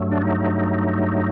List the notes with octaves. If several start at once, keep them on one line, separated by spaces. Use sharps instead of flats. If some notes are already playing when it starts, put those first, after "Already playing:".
Already playing: G2 F#3 A3
D4
D#4